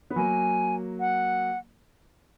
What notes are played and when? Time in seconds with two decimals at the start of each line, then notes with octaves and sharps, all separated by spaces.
0.10 B3
0.16 F#3 A#3 G#5
1.00 F#5